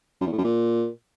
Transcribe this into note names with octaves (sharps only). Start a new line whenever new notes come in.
F#2
E2
A2
F#2
A#2